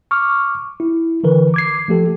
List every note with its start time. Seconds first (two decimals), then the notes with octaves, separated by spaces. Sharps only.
0.11 C#6 D6 F6
0.80 E4
1.23 D3 E3 A#4 B4
1.54 D6 G#6 C7
1.88 F3 A3 G4 A4